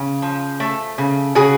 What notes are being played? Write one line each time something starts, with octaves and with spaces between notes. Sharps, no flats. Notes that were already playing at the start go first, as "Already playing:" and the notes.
Already playing: C#3
F3
A3
C#3
C#3 F#4 G#4